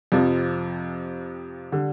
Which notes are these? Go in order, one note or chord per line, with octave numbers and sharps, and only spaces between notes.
F2 C3 F3
D3 G3